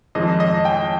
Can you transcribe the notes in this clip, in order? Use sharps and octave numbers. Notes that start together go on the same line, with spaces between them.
F2 D#3 G#3 D#5
D#5
G5